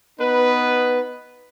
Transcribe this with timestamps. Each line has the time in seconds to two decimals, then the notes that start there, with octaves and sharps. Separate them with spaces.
0.20 B3 D#4 B4